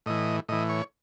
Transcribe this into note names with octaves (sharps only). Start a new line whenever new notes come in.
A2 E3 D#5
A2 E3 D#5
C#5